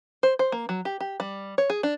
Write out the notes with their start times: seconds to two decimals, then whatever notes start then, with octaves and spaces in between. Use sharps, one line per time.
0.23 C5
0.39 C5
0.52 A#3
0.69 F#3
0.85 G4
1.00 G4
1.20 G3
1.58 C#5
1.70 G#4
1.83 D4